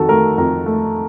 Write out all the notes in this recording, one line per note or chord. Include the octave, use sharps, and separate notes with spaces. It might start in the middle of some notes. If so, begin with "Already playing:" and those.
Already playing: F2 D#3 F#4 A4
A3 A#4
F2 A#4
A3